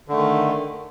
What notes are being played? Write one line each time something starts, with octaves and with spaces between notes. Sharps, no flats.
D3 D#3 A3